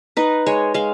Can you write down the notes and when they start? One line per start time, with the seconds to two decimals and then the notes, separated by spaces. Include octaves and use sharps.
0.17 D#4 B4
0.46 G#3 C#5
0.74 G#3 F5